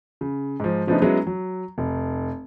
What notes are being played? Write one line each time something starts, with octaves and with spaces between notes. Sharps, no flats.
C#3
G#2 F3
C#3 F3 A3 B3 D4 D#4
F#3 G#3 B3 C#4 E4
F#3
F1